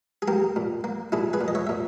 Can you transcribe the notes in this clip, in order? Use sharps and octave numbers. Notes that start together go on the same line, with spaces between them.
G#4
A#3 G4 A#4
A#2
A#3
A#2 E4 G#4
G#4 B4
A#2
D#5
C#5 E5
A#2 E5